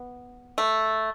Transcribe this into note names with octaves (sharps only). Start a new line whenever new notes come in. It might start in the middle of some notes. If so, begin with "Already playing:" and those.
Already playing: B3
A3